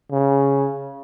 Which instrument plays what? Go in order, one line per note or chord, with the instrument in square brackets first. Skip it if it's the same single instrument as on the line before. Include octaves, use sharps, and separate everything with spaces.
[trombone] C#3